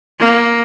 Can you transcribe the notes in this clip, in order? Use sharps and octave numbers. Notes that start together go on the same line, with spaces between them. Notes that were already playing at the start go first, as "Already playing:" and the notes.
A#3